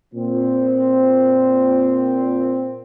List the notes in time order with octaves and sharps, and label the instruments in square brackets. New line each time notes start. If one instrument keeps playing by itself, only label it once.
[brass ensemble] A#2 C4